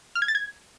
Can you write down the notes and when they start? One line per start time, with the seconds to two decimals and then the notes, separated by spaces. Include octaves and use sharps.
0.15 F6
0.22 G#6
0.28 A6
0.35 G#6